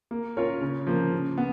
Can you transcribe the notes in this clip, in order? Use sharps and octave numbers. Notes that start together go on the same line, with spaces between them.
A#3
C#4 F4 A#4 C#5
C#3
F3 A#3
C#3
B3